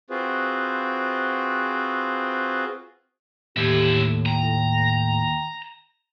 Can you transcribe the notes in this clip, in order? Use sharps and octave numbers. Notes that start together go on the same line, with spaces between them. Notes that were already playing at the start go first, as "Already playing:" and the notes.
C4 F4 F#4 G#4 B4 C5
D#2 A2 D3 E4 G4
G5 A#5